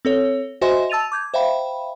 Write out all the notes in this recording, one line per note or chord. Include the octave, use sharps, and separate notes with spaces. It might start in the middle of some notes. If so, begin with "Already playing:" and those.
C4 A4 C#5
F#4 C5 D#5 E5 G#5 C6
A5 E6 A6 D#7 F7
D6 G6 G#6
C5 E5 F5 G5 B5